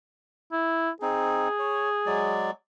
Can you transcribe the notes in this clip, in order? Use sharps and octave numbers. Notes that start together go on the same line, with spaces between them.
E4
C4 D#4 G#4
C#5
F#3 G#3 D5